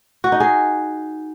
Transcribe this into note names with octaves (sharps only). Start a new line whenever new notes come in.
F#4
D#4
G#4